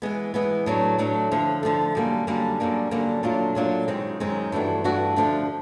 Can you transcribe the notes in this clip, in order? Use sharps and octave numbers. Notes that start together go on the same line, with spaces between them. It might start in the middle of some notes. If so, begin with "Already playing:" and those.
E3 G#3 B3
E3 G#3 B3
A2 F#3 A3 D4
A2 F#3 A3 D4
D3 F3 A3
D3 F3 A3
F#2 D3 G3 A#3
F#2 D3 G3 A#3
F#2 D3 G3 A#3 D4
F#2 D3 G3 A#3 D4
A#2 F#3 A3 D4 F4
A#2 F#3 A3 D4 F4
F#2 D#3 G#3 C4 D#4
F#2 D#3 G#3 C4 D#4
G2 E3 A3 D4 F#4
G2 E3 A3 D4 F#4
D3 F3 A3 D4